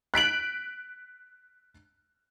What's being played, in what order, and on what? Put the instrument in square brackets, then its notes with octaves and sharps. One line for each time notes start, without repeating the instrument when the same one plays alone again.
[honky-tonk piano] F#6 B6 D7 F#7